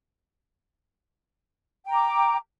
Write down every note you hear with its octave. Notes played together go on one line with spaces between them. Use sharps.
G5 A#5 D6